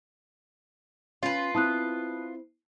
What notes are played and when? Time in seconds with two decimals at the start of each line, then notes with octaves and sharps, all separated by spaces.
1.23 C#4 F4 B4
1.55 C4 E4 A5 D#6 F#6